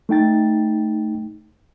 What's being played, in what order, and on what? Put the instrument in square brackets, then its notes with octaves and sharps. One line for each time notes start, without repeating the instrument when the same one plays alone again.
[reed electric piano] A3 D#4 G5 A6